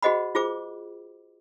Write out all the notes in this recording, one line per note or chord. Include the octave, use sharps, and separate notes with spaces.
F#4 G#4 C5 D#5 F#5 B5
F4 G#4 C5 D6